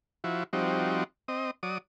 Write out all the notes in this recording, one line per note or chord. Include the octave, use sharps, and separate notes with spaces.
F3 E4 F#4
F3 G3 C4 D#4 F#4
C4 D#5
F#3 D5 D#6